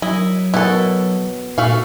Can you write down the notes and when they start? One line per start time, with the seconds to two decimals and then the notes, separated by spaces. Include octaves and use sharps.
0.02 F#3 E4 D#5
0.54 B2 E4 A4
1.58 A#2 A3 F#4 F5